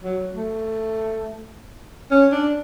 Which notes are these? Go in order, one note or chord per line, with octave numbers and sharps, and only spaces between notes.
F#3
A3
C#4
D4